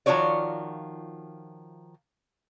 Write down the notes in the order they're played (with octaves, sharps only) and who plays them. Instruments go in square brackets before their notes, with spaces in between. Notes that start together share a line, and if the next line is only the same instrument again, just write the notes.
[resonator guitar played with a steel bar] D#3 F3 F4 F#4 C#5 D5